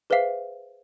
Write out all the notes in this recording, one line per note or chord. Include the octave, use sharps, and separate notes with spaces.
G#4 B4 C5 E5 F5 C7